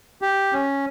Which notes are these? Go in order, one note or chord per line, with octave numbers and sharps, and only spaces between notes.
G4
C#4